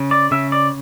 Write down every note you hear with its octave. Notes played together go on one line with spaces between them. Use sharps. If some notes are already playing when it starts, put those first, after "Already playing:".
Already playing: C#3
D5
C#3 E5
D5